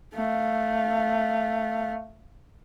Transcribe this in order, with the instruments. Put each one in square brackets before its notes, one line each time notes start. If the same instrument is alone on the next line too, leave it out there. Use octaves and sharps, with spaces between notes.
[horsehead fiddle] A3 F5